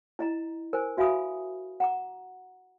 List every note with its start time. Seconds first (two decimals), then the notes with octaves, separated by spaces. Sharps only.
0.19 E4 D#5 A#5
0.73 A#4 C5 G#5
0.97 F#4 E5 F5 G#5 B5 D#6
1.80 F#5 A#5 D6